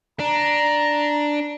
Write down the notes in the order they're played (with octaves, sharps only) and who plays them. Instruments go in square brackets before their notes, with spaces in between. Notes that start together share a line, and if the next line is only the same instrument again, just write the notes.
[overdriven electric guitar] D4 [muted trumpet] A#5